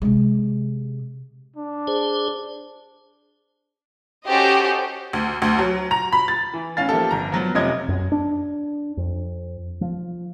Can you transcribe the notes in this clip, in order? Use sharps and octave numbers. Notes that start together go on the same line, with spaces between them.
C3 G#3
D4
G#4 C5
C#4 F#4 G4 A4 C5 D#5
D2
D2
F#3
A#5
B5
A6
E3
A2 C#4 F5 A6
F3 A#3 E4 G4 A4
G1 A#5
F3 F#3 B3
F1 C3 F4 C#5 D#5 G#6
F#2
D4
F2
F3